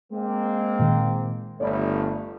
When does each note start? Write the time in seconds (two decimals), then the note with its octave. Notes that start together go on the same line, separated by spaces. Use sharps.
0.12 G#3 A#3 C4
0.79 A#2 D#3
1.60 G1 A3 C#5 D5 B5